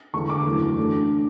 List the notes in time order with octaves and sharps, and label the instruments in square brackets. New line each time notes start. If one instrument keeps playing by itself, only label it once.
[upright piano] E2 D3 G#3 D4 C#6
D6
F#2 E3 A3
A3 D4